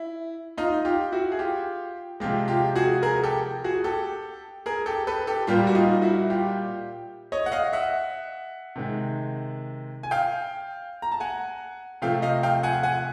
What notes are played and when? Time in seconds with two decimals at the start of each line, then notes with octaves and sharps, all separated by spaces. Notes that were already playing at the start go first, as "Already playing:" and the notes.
Already playing: E4
0.58 D#4 F4
0.85 F4 G4
1.12 E4 F#4
1.32 G#4
1.39 F4 G4
2.20 C3 F3 G#3 F4 G4
2.48 F4 G4
2.75 F#4 G#4
3.03 G#4 A#4
3.23 G4 A4
3.64 F#4 G#4
3.84 G4 A4
4.66 G#4 A#4
4.86 G4 A4
5.07 A4 B4
5.27 G4 A4
5.47 A#2 G3 A#3 F4 G4
5.67 F#4
5.75 D#4 F4
6.02 E4 F#4
6.30 F4 G4
7.32 C#5 D#5
7.46 F#5
7.52 D#5 F5
7.73 E5 F#5
8.76 C3 D#3 G#3
10.03 G#5
10.11 F5 G5
11.02 A#5
11.12 A5
11.20 F#5 G#5
12.02 C3 F3 A3 F5 G5
12.22 D#5 F5
12.43 F5 G5
12.63 F#5 G#5
12.83 F#5 G#5